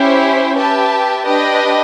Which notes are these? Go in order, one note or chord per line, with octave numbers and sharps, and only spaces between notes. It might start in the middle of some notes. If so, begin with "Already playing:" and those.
Already playing: C#4 E4 G4 C5 E5
G4 B4 E5 A5
D4 G4 B4 D#5